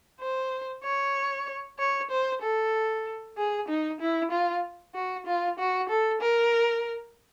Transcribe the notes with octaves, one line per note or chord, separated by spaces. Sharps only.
C5
C#5
C#5
C5
A4
G#4
D#4
E4
F4
F#4
F4
F#4
A4
A#4